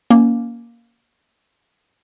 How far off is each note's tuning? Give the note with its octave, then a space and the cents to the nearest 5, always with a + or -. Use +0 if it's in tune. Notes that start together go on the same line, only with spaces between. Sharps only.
A#3 +5 C#4 +20